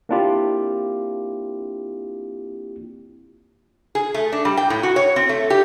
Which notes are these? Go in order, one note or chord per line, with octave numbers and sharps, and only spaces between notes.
A#3 C4 D4 E4 F4 G4
G#4
A3
D4
G3
G5
A2
F#4
C#5
C4
A3
G4